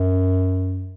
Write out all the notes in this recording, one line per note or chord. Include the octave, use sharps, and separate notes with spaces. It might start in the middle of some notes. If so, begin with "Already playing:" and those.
Already playing: F#2